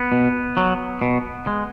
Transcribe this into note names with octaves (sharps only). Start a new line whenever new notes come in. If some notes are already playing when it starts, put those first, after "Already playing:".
Already playing: B3
B2
F#3
B2
G#3